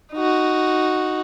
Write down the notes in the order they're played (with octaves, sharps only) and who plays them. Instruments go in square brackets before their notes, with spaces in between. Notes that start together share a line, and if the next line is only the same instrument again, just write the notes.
[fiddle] D#4 F#4